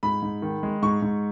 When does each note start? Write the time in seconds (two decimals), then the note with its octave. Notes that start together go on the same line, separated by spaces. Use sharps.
0.03 G#2 B5
0.23 G#2
0.42 D#3
0.63 G#3
0.82 G#2 C#6
1.02 G#2